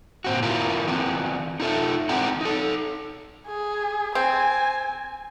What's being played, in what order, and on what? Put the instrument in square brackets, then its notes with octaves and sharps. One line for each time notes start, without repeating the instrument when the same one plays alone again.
[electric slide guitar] A#2 C4 F#4
E4 F4 A#4
E3 B3 C4
D#4 F4 A4 E5
E3 G#3 C4 D5 F#5 A#5
D#4 A4
[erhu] G#4
[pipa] C4 [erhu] G#5